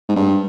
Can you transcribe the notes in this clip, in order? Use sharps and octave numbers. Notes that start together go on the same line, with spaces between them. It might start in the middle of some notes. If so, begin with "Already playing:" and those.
G#2
G2